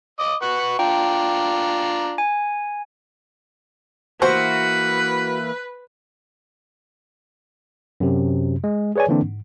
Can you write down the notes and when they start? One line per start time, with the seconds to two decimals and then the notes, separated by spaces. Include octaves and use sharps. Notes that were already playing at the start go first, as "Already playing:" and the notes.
0.19 D#5 D6 D#6
0.42 B4 F#5 C#6
0.79 D4 F4 G5 A#5
2.18 G#5
4.22 E3 A#3 E4 F#4 B4 C5
8.00 F#2 C3
8.64 G#3
8.96 G#4 B4 C#5 D5 G#5
9.09 D3 E3 A#3 C4 D4
9.22 G#2